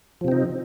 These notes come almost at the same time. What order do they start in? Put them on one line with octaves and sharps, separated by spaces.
F3 C3 C4 D#4